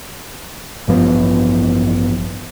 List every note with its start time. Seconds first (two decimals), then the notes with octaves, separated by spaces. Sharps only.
0.88 A1 G2 F3 B3